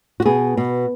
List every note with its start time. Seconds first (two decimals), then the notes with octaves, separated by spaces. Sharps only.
0.20 F#4
0.26 B2 G#4
0.57 B2